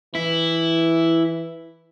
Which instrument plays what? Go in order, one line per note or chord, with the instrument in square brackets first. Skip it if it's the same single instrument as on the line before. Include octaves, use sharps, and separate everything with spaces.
[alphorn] E3 [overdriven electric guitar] E4